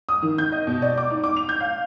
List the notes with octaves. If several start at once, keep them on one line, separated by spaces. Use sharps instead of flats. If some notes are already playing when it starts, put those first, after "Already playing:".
D#6
D#3
G6
D#5
B2
D5
D6
D#4
D6
F7
G6
F5